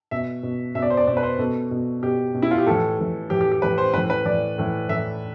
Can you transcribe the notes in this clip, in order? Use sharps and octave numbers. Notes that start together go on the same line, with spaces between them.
B2 E5
B2
B2 E5
D5
C5
D5
B2 D5
B4
C5
B2 A4
B2
B2 G4
B2
E4
F4
G4
A2 E3 A4
A2 E3
A2 E3 G4
G4
G4
A2 E3 B4
C5
A2 E3 B4
B4
A2 E3 D5
A2 E3
A2 E3 E5